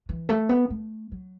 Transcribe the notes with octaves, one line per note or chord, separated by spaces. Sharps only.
E3
A3
B3
A3
F#3